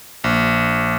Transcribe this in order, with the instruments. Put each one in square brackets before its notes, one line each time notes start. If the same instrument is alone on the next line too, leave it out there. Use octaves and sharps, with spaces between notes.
[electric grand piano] A#1